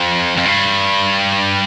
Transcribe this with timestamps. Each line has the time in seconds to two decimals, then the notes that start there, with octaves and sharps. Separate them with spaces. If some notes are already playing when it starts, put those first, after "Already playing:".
Already playing: F2
0.37 F2
0.46 G2